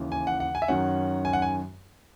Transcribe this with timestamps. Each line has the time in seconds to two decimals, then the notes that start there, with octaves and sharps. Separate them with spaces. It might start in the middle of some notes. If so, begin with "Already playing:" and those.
Already playing: D#2 C#3 E3
0.12 G#5
0.27 F#5
0.40 F#5
0.55 G#5
0.62 E5
0.68 F#2 D#3 F#3 C#4 F#5
1.25 G#5
1.33 F#5
1.42 G#5